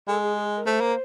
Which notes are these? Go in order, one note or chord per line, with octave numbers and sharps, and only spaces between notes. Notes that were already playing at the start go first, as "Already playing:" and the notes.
G#3 A4
G#4
G#4
A#4
A3 C5
A#3